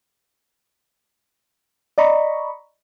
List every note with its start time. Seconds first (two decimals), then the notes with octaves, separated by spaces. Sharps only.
1.98 D5 D#5 A#5 B5 C#6